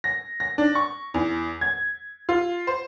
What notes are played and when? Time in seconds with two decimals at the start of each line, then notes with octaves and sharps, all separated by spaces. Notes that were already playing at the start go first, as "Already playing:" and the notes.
0.04 A#6
0.40 A#6
0.58 D4
0.75 C#6
1.14 E2
1.61 G#6
2.29 F4
2.67 C5